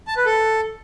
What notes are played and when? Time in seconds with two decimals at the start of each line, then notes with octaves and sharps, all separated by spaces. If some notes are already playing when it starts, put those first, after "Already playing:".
0.08 A5
0.17 B4
0.26 A4